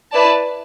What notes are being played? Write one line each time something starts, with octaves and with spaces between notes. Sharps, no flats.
E4 B4 D5 A5